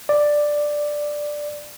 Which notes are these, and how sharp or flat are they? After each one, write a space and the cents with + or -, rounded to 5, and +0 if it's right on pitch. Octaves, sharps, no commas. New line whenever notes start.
D5 +5